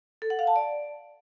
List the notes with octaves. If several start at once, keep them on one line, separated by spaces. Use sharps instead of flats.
A4
F#5
F5
A5
D5